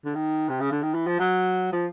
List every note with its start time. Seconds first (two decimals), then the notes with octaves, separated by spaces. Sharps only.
0.05 D3
0.15 D#3
0.49 C3
0.60 C#3
0.71 D3
0.82 D#3
0.94 E3
1.07 F3
1.19 F#3
1.72 F3